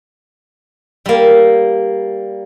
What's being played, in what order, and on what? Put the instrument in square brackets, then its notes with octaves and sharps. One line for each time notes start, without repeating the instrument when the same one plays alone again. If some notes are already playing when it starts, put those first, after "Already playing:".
[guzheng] G3 A#3